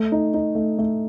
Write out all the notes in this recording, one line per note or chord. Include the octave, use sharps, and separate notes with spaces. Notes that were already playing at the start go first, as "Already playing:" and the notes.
Already playing: A3
D#4
D#4
A3
A3